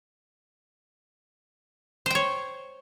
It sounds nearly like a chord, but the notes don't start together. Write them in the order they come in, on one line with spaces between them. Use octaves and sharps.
C5 G5 C#5